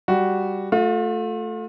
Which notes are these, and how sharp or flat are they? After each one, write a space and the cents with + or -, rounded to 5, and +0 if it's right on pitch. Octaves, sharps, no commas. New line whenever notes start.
G3 +0 F#4 +0
A3 +0 F4 +40